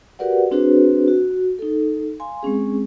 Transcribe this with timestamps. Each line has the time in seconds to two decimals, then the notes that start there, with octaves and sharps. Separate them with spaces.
0.19 F#4 G4 A#4 B4 D5 F#5
0.51 C4 D4 F#4 G#4 B4 C5
1.08 F#4
1.59 D#4 A4
2.20 F5 G#5 C6
2.43 G#3 C4 C#4 G#4